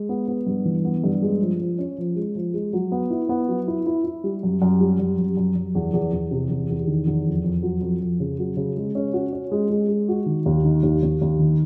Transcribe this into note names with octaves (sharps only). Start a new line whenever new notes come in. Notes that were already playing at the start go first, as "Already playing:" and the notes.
Already playing: G#3
B3
B3
G2
E3
B3
G2
G#3
F3
F3
C#4
F3
G#3
F3
G#3
F#3
B3
E4
B3
F#3
E4
E4
E4
G3
F#2
F#2
G3
F#2
F#2
F#2
F#2
E2
E2
E2
C3
E2
E2
D#3
E2
F2
F2
F#3
F2
F2
C#3
F#3
C#3
G#3
C#4
F#4
C#4
G#3
G#3
G#3
F#4
D#3
D#2
D#3
D#2
D#2
D#2
D#3